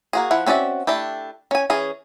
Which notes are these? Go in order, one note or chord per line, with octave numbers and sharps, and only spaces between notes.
A#3 F#4 G#4
F3 E4 F#5
C4 C#4 F#4 D5 E5
A3 D4 E4 G4
C#4 G#5
E3 C#4 G#4